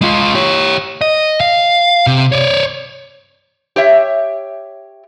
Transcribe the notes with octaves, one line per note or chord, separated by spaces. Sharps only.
G#3 F4
G4 C#5
D#5
F5
C3
C#5 D5
G4 C#5 E5